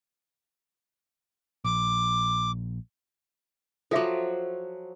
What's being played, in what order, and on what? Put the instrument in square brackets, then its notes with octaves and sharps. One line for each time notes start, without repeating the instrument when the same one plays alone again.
[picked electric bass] A#1 [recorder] D6
[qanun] F3 F#3 [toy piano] A4 E5 D6